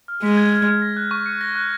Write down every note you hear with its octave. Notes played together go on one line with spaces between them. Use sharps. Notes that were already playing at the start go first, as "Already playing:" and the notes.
F6
G#3 B6
G#6
F6
F6
A#6
F#6
C#6
C#7
A#6
F#6